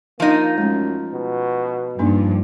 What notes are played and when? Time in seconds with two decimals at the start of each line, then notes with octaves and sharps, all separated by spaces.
0.20 F3 A#3 D#4 F5
0.58 F#2 G#3 A3 C#4
1.13 B2
1.99 G2 F3 A#3 D4 D#4